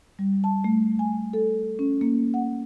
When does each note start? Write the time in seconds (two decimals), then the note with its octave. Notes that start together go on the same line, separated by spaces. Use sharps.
0.19 G3
0.44 A5
0.64 A3
0.99 G#5
1.33 A4
1.79 C#4
2.01 A#3
2.34 F#5